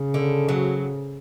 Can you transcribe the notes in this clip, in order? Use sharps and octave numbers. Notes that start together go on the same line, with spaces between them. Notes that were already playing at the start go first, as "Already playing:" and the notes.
Already playing: C#3
D3
F#3